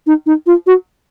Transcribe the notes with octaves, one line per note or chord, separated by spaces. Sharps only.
D#4
D#4
F4
F#4